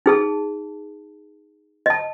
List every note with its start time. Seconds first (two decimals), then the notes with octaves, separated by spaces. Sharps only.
0.06 D#4 G#4 A5
1.86 D#5 A5